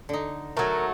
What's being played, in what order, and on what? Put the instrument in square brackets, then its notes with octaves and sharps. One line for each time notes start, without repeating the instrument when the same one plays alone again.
[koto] D3 D#4
[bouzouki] F#3 A3 [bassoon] A#4